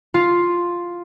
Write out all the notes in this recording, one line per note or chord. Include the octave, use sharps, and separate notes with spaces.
F4